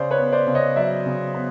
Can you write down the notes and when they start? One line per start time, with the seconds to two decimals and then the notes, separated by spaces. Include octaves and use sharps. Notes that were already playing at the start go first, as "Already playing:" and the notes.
Already playing: C#3 C5 D5
0.11 B4 C#5
0.18 B3
0.32 C5 D5
0.47 C#3
0.55 C#5 D#5
0.76 F#3 D5 E5
1.06 C#3
1.34 B3